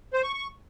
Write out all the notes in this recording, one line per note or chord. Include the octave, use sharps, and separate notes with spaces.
C5
C#6
C#6